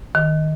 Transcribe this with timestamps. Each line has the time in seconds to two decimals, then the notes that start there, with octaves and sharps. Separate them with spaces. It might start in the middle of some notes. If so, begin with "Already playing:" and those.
0.15 D#3